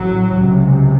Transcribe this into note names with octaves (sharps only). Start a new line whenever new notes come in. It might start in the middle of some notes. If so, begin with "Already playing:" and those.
Already playing: A1 A2 F#3
C#2 C3